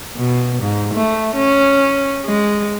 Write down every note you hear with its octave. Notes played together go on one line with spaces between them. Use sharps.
B2
G#2
A3
C#4
G#3